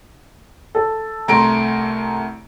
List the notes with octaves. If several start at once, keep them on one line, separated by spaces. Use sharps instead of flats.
A4
C2 A3 A#5 C6 D7